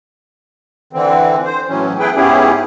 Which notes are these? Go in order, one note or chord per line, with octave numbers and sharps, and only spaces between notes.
D3 E3 C4
C5
A2 E3 F#3 C#4
A3 B3 E4 G#4 B4 G5
G#2 B3 C#4 E4 G4 G#4